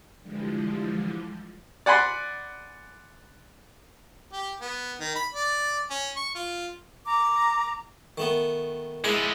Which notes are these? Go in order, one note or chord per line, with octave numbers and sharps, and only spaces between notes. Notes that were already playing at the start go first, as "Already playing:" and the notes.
D3 E3 F3 G3 G#3
D5 F#5 G#5 B5 C6
G4
B3
D#3
B5
D5
C#4
C#6
F4
A#5 D6
D#3 A3 B3
G#3 D4 E4 G#4